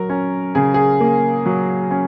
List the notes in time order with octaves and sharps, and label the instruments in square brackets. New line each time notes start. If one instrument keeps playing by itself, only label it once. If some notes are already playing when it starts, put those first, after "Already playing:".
Already playing: [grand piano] F#3 A#4
C#4
C#3 G#4
G#4
A#3
F#3
C#4